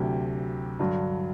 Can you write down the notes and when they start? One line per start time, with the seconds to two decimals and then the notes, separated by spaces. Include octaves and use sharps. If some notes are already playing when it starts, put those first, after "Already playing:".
Already playing: D2 C3 F#3 G4
0.79 G2 D3 F#3